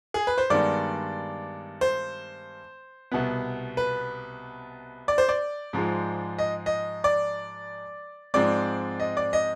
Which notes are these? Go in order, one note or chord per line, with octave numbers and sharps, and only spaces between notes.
G#4
B4
C5
G2 D#3 G#3 B3 D5
C5
C2 B2 B3
B4
D5
C5
D5
G#2 F3 G#3
D#5
D#5
D5
G#2 F3 G#3 C4 D5
D#5
D5
D#5